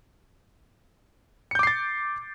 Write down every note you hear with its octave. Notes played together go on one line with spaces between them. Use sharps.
D6 G6 A6 C7 C#7